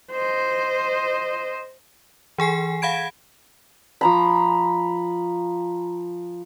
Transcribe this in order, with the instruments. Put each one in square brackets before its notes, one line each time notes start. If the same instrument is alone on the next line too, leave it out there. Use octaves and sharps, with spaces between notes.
[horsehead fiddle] C5 D#5
[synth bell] E3 G#4 G#5 C7
F5 F#5 B5 G#6 D7
[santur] F3 A#5 B5